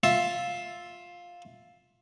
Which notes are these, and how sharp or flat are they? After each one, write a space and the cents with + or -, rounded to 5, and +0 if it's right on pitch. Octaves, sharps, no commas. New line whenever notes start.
F4 +10 E5 +0